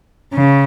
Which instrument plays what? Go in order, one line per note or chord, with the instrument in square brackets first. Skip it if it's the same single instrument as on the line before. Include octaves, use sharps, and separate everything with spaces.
[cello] C#3